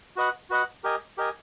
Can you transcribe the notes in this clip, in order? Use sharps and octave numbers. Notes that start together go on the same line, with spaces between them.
F#4 B4 D#5 F#5
F#4 B4 D#5 F#5
G4 A#4 D#5 G#5
G4 A#4 D#5 G#5